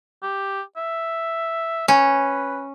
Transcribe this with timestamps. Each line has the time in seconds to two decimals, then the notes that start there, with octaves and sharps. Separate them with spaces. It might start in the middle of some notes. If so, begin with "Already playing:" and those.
0.22 G4
0.77 E5
1.88 C#4 B4